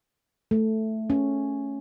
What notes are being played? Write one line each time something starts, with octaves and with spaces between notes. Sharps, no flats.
A3
C#4